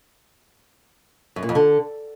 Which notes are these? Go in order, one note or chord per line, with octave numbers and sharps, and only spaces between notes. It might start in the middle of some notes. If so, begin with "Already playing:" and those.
F#2
A#2
F2
D3